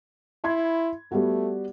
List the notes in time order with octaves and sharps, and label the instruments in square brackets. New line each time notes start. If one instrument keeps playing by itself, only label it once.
[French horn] E4 [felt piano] B5 C6 G#6
[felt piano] G3 B3 F#4 [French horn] A3